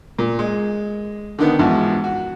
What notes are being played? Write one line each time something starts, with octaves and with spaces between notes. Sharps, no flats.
A#2
G#3
D3 D#3 B3
E2 G#2 F3 F#4
F#4